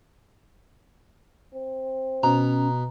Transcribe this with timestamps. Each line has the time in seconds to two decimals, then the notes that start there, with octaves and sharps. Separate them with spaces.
1.54 C4
2.23 B2 C#4 A#5